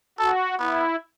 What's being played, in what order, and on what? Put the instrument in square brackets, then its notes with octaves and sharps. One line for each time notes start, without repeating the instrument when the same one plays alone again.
[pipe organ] F#4 [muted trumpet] A4
[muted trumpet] B3 [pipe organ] E4